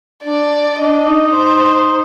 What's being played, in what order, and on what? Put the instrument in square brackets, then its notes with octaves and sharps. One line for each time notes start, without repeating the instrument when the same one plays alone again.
[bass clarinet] D4 [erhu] D5
[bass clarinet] D4 [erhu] D#5
[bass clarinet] D#4
[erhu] C5